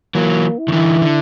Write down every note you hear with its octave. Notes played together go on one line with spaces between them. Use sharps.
E3 F#3 A#3
E4
D#3
D3 E3
D3